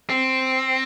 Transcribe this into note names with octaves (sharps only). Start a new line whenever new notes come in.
C4